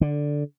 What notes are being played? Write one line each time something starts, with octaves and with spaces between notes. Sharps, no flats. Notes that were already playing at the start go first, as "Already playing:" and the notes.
D3